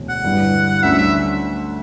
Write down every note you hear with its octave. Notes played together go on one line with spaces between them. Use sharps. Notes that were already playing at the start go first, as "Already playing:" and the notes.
Already playing: E1 D2
F#5
G1 G2 E3 G3
D2 D3 G3 C#4 E5
E5